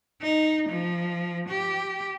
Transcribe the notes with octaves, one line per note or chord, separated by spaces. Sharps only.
D#4
F3
G4